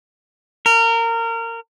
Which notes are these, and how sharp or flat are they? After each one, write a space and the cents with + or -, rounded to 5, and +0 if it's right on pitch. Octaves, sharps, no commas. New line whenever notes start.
A#4 -25